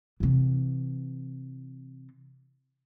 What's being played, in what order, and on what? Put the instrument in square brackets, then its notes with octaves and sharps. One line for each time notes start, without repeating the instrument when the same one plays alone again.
[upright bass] C3 E3